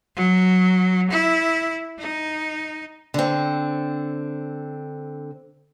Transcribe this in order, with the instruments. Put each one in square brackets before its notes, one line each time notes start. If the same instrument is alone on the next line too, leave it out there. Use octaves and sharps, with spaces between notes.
[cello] F#3
E4
D#4
[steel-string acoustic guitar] D3 C4